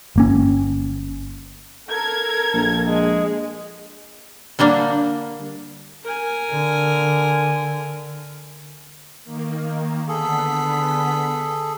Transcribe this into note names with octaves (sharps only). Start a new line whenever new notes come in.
G1 A#3 C#4
A4 A#4 G#6
A#1
G#3
D3 G3 A#3 D4
A#4 G#5
D3
D#3 A#3
D3 B3 G#4 A4 B6